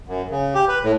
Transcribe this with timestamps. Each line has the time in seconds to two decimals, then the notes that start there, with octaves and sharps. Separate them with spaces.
0.08 F#2
0.31 C#3
0.54 G4
0.68 B4
0.83 A2